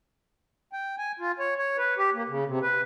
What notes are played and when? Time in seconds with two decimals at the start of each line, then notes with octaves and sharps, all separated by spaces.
0.73 G5
0.98 G#5
1.19 F4
1.39 C#5
1.58 C#5
1.78 B4
1.98 G4
2.14 A#3
2.29 C#3
2.46 C3
2.62 B4